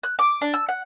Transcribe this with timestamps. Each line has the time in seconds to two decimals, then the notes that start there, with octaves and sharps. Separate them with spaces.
0.03 F#6
0.19 D6
0.41 D4
0.54 E6
0.69 F#5